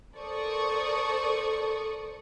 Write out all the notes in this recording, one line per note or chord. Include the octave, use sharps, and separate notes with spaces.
A4 A#4 C5 D5 C#6 D#6